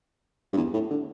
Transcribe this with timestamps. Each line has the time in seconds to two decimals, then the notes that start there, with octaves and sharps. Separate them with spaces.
0.53 G2
0.57 E2
0.74 A2
0.90 D3